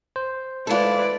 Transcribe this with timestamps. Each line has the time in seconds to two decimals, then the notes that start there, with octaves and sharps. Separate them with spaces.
0.16 C5
0.67 G#3 E4 F4 A4 B4 D5